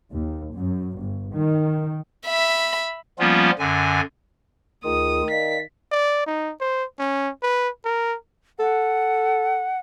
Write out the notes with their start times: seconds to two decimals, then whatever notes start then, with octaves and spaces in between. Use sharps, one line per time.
0.12 D#2
0.55 F#2
0.99 G1
1.33 D#3
2.26 E5 B5
3.19 F3 G3 A#3 B3 C#4 F4
3.59 F#2 D3 G#5
4.85 D2 D#3 F4 G#4 D#6
5.30 D5 D#5 F5 B6
5.92 D5
6.26 D#4
6.60 C5
6.99 C#4
7.43 B4
7.85 A#4
8.59 A4 F#5